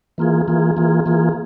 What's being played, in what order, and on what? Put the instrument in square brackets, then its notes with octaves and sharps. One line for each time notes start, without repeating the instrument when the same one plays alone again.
[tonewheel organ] E3 A#3 F4 G#4
E3 A#3 F4 G#4
E3 A#3 F4 G#4
E3 A#3 F4 G#4